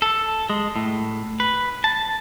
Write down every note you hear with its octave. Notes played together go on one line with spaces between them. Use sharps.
A4
G#3
A2
B4
A5